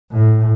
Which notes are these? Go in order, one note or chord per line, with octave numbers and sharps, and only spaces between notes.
A2